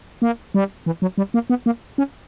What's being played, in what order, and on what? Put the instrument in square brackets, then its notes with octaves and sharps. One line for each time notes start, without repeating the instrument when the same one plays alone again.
[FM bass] A#3
G3
E3
F#3
G3
A#3
B3
A#3
C#4